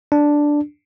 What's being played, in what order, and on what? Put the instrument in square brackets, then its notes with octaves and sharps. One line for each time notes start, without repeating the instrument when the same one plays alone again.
[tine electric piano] D4